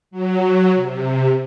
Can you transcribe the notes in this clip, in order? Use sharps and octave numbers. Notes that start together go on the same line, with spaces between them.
F#3
C3